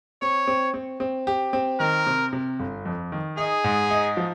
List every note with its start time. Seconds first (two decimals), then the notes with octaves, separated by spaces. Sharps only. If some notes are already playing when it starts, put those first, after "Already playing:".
0.22 C4 C#5
0.47 C4
0.74 C4
1.00 C4
1.27 G4
1.53 C4
1.80 D#3 A#4
2.07 C3
2.33 C3
2.59 G1
2.85 F2
3.12 D#3
3.37 D#4 G#4
3.64 G#2
3.91 D#4
4.17 F3